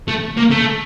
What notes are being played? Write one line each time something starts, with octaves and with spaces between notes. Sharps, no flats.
A3
A#3
A3